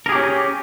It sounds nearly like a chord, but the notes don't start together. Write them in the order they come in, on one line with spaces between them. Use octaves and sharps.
A#4 G#4 G4 C#4